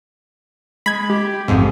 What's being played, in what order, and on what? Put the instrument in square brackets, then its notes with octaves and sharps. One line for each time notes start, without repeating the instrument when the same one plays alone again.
[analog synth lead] G#3 [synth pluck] B5 G#6
[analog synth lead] G4
[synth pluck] A1 F2 G#2 [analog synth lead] C3